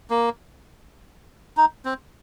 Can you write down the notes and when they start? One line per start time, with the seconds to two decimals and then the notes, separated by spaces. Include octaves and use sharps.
0.10 A#3
1.57 D#4
1.85 C4